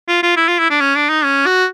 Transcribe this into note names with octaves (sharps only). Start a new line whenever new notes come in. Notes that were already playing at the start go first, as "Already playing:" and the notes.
F4
F4
E4
F4
E4
D4
C#4
D4
D#4
C#4
F#4